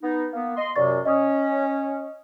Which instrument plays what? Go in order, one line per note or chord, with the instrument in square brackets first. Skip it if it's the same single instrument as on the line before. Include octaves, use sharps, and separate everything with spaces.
[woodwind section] B3 D#4
A#3 B3
D#5 C6
[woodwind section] F#2 C3 [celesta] D5 C#6 A6
[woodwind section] C#4 [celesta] D#5 C#6 D#6